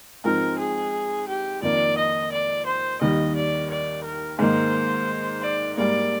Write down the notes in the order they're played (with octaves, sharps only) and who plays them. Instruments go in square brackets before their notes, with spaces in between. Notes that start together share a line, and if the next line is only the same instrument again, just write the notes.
[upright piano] G#2 F3 C4 D#4 [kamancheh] A#4
[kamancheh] G#4
G4
[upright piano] F2 D#3 A#3 [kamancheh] D5
[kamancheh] D#5
D5
C5
[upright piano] D#2 D#3 G3 [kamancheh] D#5
[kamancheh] D5
D5
A#4
[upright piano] G#2 D#3 A#3 D#4 [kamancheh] C5
[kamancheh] D5
[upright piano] G#2 G3 A#3 [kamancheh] D5